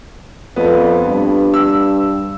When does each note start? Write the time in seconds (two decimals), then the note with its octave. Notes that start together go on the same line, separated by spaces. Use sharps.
0.56 F2 B3
1.07 G2
1.54 E6